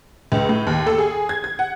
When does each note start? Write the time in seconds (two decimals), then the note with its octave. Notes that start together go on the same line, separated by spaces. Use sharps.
0.32 C#2
0.49 A2
0.67 D#2
0.87 A4
0.98 G#4
1.29 G#6
1.44 G#6
1.59 F#5